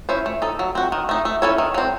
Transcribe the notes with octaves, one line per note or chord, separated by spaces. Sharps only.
C#4 E4 C5
A3
D#4 A4
F#3
C4 F#4
D#3
A3 D#4
A3
C#4 E4 A4 C#5
D#3
F#3 C4